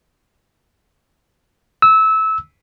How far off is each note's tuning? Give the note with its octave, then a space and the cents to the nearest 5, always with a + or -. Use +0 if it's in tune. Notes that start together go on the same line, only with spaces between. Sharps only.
E6 -20